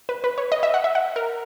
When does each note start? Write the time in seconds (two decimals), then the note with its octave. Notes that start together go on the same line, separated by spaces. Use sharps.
0.09 B4
0.24 B4
0.38 C#5
0.52 D#5
0.63 E5
0.74 F#5
0.84 E5
0.95 F#5
1.16 A#4